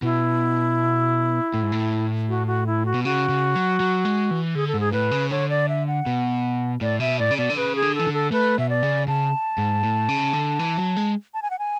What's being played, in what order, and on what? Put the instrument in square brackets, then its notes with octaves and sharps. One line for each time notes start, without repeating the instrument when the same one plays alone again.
[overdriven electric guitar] B2 [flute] E4
[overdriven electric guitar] A2
G#2
A2
[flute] F#4
F#4
E4
F#4
[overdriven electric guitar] B2
[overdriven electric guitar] C#3 [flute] F#4
[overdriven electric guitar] C#3
F#3
F#3
G#3
E3
[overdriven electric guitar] D3 [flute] G#4
[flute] A4
[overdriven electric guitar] G#2
[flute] G#4
[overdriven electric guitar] A2 [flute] B4
[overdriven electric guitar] C#3
[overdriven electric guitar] D3 [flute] C#5
[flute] D5
E5
F#5
[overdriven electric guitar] B2
[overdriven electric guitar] A2 [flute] D5
[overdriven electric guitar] B2 [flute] E5
[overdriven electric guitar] A2 [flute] D5
[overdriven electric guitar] C#3
[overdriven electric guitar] B2 [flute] D5
[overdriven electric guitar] D3
[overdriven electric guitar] C#3 [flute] B4
[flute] G#4
[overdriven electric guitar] D3
[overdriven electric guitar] E3 [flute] A4
[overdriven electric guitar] D3
[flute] A4
[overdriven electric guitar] A3 [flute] B4
[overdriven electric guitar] B2 [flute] E5
[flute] D5
[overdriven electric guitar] C#3
[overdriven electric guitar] C#3 [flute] A5
[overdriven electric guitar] G#2
A2
C#3
D3
E3
F#3
G#3
[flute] A5
G#5
F#5
G#5